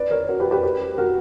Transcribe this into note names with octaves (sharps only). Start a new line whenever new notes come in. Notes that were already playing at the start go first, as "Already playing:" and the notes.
Already playing: B4 D5
A#4 C#5
F#4 A#4
G4 B4
G4 B4
G4 B4
F#4 A#4